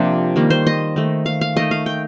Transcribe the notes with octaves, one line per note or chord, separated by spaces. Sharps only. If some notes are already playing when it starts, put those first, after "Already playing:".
Already playing: C3 F3 A#3 D4 G4
D#3 G3 A#3
C5
D#5
D#3 A3
F5
F5
D#3 A3 D#5
F5
G5